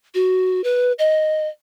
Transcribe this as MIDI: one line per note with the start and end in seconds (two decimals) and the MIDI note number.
0.14 0.63 66
0.64 0.92 71
0.99 1.47 75